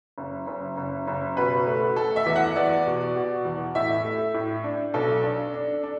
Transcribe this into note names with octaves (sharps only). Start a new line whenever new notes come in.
F#1
F#1
F#1
F#1
B2 B4
A3
A3 A4
E5
E2
F#5
E2 D5
B2
B2
E2
A2 E5
A3
A2
D4
B1 A4
D4
D4
D4